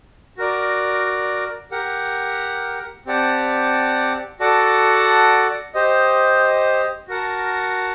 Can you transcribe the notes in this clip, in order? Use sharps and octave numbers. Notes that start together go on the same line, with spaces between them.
F#4 A#4 D5
G4 A#4 F#5
C4 G4 D5 F#5 A5
F#4 A4 D5 F#5 A5
G4 C5 D#5
F#4 A#4 F#5 A5